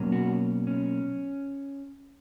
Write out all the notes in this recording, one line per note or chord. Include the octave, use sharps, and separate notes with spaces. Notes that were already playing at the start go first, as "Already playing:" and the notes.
Already playing: B2 F#3 A#3 C#4
F#4
C#4